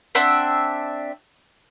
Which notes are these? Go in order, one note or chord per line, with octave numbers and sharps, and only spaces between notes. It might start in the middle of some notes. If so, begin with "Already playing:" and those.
C4 D4 E5 F#5